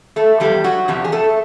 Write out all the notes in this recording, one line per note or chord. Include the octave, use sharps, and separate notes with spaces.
A3 A4
E2 C3 F3 G3 G4
F#3 F#4
E2 C3 F3 G4
G#4
A3 A4